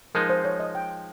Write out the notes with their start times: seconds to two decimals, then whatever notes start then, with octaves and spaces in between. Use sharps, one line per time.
0.15 F3 G#3 D#4 A#4
0.29 C5
0.45 C#5
0.60 D#5
0.75 G5